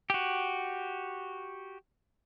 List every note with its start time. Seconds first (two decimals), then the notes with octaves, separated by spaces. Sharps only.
0.10 F#4 G4